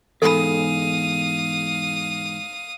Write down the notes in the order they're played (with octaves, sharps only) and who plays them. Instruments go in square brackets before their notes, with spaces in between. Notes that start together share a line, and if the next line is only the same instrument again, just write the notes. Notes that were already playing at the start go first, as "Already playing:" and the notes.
[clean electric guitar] E2 G#2 G#4 [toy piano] A4 B5 [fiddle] F5 D#6